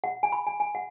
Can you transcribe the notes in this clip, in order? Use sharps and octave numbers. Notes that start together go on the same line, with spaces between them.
F#5
G#5
B5
G#5
G#5
F#5